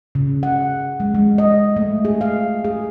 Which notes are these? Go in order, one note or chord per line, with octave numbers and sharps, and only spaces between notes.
C#3
F#5
G#3
G#3
D#5
A3
G#4
F5
G#4